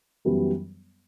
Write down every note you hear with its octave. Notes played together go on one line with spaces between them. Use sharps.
F#2 E3 G3 B3